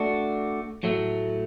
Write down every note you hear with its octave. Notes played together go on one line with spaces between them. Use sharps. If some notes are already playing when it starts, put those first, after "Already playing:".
Already playing: A3 D4 F#4
A2 F#3 A3